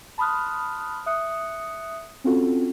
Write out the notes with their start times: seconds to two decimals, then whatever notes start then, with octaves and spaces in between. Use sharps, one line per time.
0.18 A5 B5 C6 D#6 F6 F#6
1.06 E5 D#6 F#6 C#7
2.24 C4 C#4 F4 F#4 A4